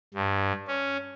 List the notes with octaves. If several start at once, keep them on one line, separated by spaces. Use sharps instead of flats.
G2
C#4